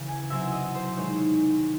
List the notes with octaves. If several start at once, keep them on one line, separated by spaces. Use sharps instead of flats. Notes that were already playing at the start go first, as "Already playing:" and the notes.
Already playing: C#3 E3
G#5
C3 F#3 C4 E4 E5
D#5
C5
D#3 G#3 D#4 C#5